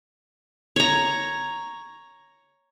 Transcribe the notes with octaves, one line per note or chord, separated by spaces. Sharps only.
C#5 A#5